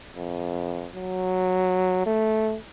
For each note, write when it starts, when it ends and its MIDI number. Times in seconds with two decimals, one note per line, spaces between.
0.16 0.88 41
0.95 2.03 54
2.06 2.57 57